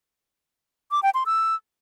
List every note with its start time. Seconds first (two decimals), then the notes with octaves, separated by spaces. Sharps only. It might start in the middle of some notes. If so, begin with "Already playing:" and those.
0.91 D6
1.03 G5
1.14 C6
1.26 E6